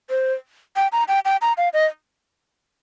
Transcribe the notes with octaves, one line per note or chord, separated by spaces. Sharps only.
C5
G5
A#5
G5
G5
A#5
F5
D#5